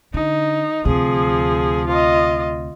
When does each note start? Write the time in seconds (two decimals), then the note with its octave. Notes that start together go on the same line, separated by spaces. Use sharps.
0.14 D3 D#4
0.85 D2 C3 F3 G#4
1.88 F4 D#5